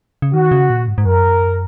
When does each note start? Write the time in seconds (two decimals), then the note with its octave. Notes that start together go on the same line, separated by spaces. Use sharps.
0.22 C#3
0.34 D#3 F#4
0.52 C#3
0.70 A#2
0.88 G#2
0.98 G#2
1.05 F#2 A#4